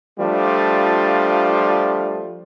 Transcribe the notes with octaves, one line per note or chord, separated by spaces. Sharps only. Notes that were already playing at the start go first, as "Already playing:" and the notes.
F3 G3 A3 D4 F4